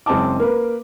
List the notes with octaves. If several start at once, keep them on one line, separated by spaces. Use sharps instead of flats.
F#1 G#3 C4 D#5 A5 D6
A#3 A#4 B4